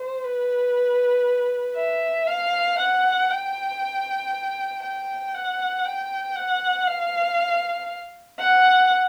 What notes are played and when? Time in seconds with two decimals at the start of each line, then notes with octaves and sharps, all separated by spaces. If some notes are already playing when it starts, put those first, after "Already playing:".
Already playing: C5
0.24 B4
1.76 E5
2.27 F5
2.78 F#5
3.30 G5
4.83 G5
5.34 F#5
5.84 G5
6.36 F#5
6.87 F5
8.40 F#5